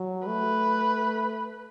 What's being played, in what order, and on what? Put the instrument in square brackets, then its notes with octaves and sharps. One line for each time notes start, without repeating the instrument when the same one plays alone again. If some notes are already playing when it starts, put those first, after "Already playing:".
Already playing: [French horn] F#3
[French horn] A3 [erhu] B4